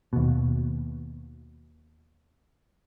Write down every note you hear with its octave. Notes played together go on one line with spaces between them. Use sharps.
D#2 B2